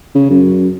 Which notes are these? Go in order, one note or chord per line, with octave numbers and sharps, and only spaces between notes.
C#3
F#2